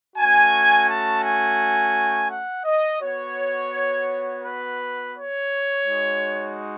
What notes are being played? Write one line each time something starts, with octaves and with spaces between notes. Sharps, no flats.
A3 C#4 F#4 G#5
A5
G#5
F#5
D#5
B3 F#4 C#5
B4
C#5
G#3 D#4 F#4